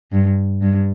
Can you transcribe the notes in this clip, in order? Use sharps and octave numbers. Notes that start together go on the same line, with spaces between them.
G2
G2